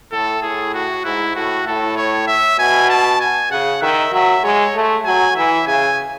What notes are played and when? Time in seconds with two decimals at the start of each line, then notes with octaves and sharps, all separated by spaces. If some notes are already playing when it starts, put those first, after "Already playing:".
0.12 A2 A4
0.42 A2 G#4
0.74 F#4
1.04 G#2 E4
1.35 A2 F#4
1.67 A2 A4
1.97 C#5
2.28 E5
2.59 B2 G#5
2.90 A5
3.20 G#5
3.51 C#3 F#5
3.82 D#3 E5
4.12 F#3 E5
4.44 G#3 C#5
4.75 A3
5.05 F#3 G#5
5.36 E3 E5
5.67 C#3 G#5